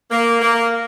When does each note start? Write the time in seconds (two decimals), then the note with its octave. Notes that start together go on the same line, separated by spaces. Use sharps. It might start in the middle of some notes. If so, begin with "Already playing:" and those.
0.11 A#3
0.41 A#3